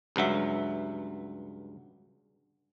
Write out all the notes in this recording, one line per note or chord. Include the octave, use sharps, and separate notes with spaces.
C#2 G2 F#3 E5